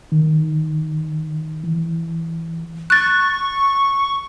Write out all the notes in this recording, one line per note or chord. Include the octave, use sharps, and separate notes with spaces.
D#3
E3
C#6 F#6 A6